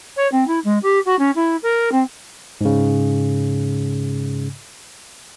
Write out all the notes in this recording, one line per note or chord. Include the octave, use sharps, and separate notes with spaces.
C#5
C4
E4
G#3
G4
F#4
C#4
E4
A#4
C4
G#2 C#3